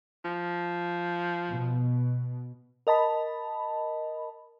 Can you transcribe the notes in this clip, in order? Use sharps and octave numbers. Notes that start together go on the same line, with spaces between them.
F3
B2
A#4 D#5 A5 B5